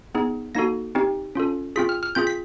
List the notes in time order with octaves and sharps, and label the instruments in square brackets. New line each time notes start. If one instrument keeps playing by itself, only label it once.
[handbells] B3 D#4 G#4
A#3 D#4 F#4 A4 A#6
C4 D#4 G4
C#4 F4 A4
C4 F4 G#4 B6
F6
F6
C4 F4 G#4 G6
B6